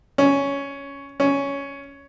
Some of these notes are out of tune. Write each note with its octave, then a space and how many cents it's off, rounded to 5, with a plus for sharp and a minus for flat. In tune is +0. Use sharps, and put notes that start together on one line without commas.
C#4 +5
C#4 +5